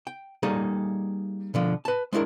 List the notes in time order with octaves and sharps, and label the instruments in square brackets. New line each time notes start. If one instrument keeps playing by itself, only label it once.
[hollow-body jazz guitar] G5
G3 A#3 D#4 G#4 A4
B2 D3 F3
B4 A5
G#3 D4 E4 G4 A#4